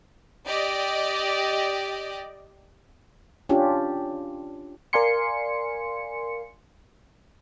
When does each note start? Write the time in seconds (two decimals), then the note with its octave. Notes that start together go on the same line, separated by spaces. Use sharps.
0.46 G4 D5 D#5
3.49 C#4 D4 F4 G4
4.93 A#4 D5 F5 G#5 C6 C#7